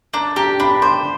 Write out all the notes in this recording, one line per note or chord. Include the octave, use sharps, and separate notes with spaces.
D4 A#5
G4 A#5
D4 B5
C5 D6